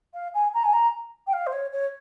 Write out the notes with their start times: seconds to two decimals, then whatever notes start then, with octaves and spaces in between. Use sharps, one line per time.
0.14 F5
0.34 G#5
0.54 A#5
0.64 G#5
0.73 A#5
1.27 G5
1.33 F5
1.46 C5
1.52 C#5
1.72 C#5